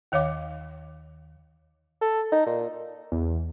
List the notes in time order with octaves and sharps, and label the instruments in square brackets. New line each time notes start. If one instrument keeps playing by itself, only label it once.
[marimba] D#2 D#3 C#5 F5 D6
[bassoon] A4
D#4
A#2
[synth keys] E2